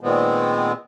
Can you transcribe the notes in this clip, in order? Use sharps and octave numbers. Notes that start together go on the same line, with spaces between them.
A#2 D#3 G#3 B3 C4